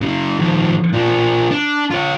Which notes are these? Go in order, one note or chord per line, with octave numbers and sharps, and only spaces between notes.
C#3 F#3
F2 D#3
F3 D4
D4
F4 C#5